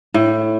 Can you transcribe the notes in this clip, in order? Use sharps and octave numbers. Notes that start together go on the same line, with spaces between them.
A2